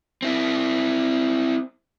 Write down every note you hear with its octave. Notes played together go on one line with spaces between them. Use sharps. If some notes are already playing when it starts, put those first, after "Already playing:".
C4 E4